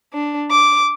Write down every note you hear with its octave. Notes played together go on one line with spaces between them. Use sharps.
D4
D6